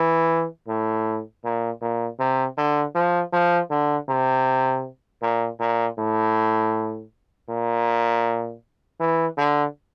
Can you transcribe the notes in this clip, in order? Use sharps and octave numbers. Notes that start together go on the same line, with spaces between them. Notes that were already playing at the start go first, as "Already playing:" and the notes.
Already playing: E3
A2
A#2
A#2
C3
D3
F3
F3
D3
C3
A#2
A#2
A2
A#2
E3
D3